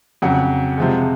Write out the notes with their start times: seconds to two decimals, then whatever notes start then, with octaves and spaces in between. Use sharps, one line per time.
0.22 F2 C#3 F#3 F#5
0.78 C3 F3 G#3